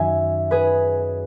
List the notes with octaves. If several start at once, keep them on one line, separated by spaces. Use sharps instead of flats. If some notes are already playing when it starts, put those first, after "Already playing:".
Already playing: F#2 D#3 E5 G#5
G#4 B4